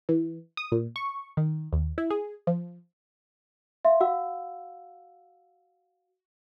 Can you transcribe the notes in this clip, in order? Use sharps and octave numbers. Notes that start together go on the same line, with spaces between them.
E3
D#6
A#2
C#6
D#3
D#2
E4
G#4
F3
E5 F5 C6
F#4 F5 F#5 E6